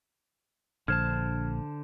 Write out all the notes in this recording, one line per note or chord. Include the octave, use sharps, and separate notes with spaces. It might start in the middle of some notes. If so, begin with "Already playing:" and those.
A#1 D3 C5 A5 F6 G#6